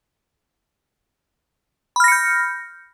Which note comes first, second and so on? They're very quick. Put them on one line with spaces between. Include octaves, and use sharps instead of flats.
B5 F6 A#6 C#7 G6